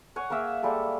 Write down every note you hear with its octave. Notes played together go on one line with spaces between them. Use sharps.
C#5 F#5 G#5
A#3 G#4 A#4 E5
G3 G#3 A#3 A4